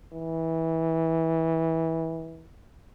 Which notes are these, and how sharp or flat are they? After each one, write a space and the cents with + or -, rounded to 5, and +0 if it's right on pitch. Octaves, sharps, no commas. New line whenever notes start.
E3 -20